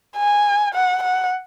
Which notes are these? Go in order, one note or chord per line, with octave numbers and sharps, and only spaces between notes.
G#5
F#5
F#5